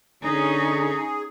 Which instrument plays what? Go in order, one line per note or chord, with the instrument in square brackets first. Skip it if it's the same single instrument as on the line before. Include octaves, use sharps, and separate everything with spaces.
[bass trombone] D3 [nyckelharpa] C#4 C#5 [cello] D#4 [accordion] G#4